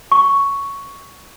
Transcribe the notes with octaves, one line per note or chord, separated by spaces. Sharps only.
C#6